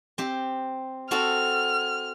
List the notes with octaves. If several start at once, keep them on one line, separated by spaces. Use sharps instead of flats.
C4 G4
C4 F#4 A4 F6